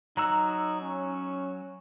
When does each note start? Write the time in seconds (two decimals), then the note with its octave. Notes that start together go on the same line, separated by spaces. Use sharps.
0.17 F#3 D#4 F#4 A#5 E6 F#6
0.82 C#4